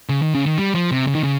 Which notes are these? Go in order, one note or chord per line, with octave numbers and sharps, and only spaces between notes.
C#3
D#3
C#3
D#3
G3
F3
C3
C#3
D#3
C#3